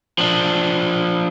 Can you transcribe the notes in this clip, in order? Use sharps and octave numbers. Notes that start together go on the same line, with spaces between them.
F3 D4